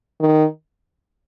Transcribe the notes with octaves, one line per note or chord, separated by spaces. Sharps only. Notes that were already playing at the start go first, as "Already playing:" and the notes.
D#3